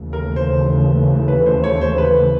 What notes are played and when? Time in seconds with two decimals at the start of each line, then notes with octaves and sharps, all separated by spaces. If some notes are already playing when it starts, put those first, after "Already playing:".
Already playing: D#2 C#3 E3 A3
0.13 A#4
0.36 C5
1.28 B4
1.46 C5
1.64 C#5
1.81 C5
1.98 B4